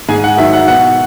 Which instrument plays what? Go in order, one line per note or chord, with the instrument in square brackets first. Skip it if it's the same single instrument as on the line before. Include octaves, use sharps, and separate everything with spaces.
[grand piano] G#2 G#4 G#5
F#5
D#3 F#3 E5
F#5
B2 F#5